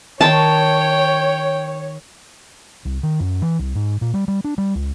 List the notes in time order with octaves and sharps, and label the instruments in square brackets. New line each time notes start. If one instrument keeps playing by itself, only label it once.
[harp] D#3 C6 D#6 [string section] C#5 [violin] G5 [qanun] A5
[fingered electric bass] C2
D#3
F#2
E3
C2
G#2
A#2
G3
G3
D4
G3
C#2